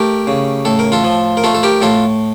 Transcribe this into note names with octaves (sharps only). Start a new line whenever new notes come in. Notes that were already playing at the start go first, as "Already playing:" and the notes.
Already playing: A3 G4 A#4
C#3
A2 A4
A#4
F4 A4
F3
A#4
A3 F4 A4
A4
G4 A#4
A2 F4 A4